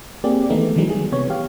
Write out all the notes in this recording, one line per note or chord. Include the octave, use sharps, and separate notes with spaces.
A#3 C4 G4 G#4 D5
D#3 E3 G#3 A3 B3 D#4
D#3 E3 F#3 G#3 B3 D#4
G3 G#4
C3 B3 C#5
G4 F5